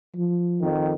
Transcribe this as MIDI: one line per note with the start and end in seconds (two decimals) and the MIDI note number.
0.16 0.70 53
0.62 0.94 41
0.62 0.94 51